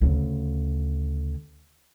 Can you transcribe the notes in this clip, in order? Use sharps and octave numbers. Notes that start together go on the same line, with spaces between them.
D2 C#3